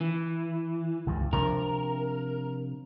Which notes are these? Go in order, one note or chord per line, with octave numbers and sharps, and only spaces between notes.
E3
C#2 G2 C#3
C3 F3 D4 A#4